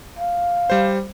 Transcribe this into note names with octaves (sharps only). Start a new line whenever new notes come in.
F5
G3 C5